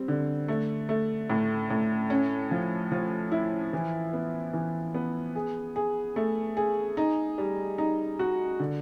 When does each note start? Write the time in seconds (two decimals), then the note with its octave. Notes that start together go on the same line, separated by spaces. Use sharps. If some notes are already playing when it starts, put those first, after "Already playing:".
Already playing: G3 C4
0.08 D3
0.48 A3
0.89 A3
1.30 A2
1.70 A2
2.10 C#4
2.51 F3
2.92 F3
3.32 E4
3.73 E3
4.13 B3
4.53 E3
4.95 B3
5.35 G#4
5.76 G#4
6.16 A3
6.57 G#4
6.97 D#4
7.38 G3
7.78 D#4
8.19 F#4
8.60 D3